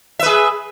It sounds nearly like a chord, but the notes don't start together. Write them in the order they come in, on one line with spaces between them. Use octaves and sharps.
E5 B4 G#4